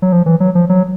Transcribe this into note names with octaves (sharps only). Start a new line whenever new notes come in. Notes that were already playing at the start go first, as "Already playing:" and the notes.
F#3
F3
E3
F#3
F3
F#3